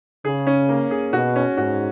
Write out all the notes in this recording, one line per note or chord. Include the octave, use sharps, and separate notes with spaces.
C#3 G#4
C#4
A#3
G#4
B2 F#4
C#4
G#2 F#4